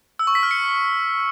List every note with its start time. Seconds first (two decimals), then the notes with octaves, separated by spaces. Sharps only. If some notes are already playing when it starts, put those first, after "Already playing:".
0.19 E6
0.27 C#6
0.35 B6
0.43 F6
0.51 C#7